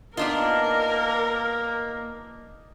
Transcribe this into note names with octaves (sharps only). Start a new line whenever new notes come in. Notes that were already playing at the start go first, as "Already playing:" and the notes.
A#3 B3 D4 D#4 F4 A#4 D5